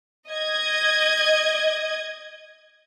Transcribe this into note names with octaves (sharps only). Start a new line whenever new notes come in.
D#5 G#6